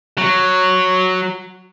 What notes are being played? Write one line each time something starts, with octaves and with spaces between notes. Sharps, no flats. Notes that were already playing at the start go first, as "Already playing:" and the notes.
F#3